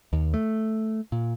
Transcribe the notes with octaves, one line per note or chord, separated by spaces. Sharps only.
D#2
A3
A#2